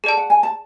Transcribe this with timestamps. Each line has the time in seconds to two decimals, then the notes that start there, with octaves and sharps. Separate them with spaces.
0.04 G#4 A4 D5 A5
0.17 F#5
0.30 G#5
0.43 A5